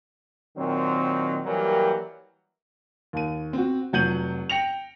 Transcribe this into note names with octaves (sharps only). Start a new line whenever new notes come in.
A#2 D#3 F#3 C4
E3 F#3 G3 A#3 G4 A#4
D#2 D#7
C4 F#4
F1 F#3 F#5 G6 D#7 F#7
G5 A#6 C#7 F7